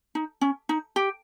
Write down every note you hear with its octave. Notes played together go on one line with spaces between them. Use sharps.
D#4
C#4
D#4
G4